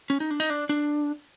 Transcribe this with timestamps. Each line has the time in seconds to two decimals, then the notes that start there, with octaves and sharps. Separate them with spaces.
0.10 C#4
0.20 D#4
0.30 D4
0.40 D#4
0.50 D4
0.69 D4